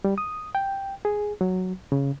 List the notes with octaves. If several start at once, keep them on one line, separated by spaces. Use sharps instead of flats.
G3
D#6
G5
G#4
F#3
C#3